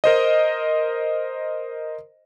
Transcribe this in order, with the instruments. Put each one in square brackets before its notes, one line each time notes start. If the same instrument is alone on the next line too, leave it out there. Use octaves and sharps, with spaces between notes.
[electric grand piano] A#4 C5 D#5